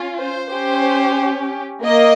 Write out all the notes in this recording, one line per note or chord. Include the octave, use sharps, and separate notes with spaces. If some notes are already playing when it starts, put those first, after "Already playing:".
Already playing: C#4 F4
C5
C#4 G4 C5
A#3 D#5